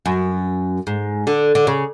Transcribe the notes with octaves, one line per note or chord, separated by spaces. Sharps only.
F#2
G#2
D3
D3
C#3